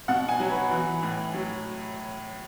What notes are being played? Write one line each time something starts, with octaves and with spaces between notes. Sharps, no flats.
B2 F#5
G#5
F#3
B4
E3
A2
F#3